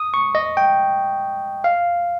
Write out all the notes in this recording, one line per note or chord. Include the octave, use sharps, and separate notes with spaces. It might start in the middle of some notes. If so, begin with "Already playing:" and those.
Already playing: D#6
C#6
D#5
G5
F5